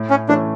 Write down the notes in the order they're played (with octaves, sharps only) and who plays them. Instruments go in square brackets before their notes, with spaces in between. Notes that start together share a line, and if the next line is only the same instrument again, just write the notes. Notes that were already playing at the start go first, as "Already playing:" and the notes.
Already playing: [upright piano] A2
[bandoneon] C#4
[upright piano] E3 A3 C#4 [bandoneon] D4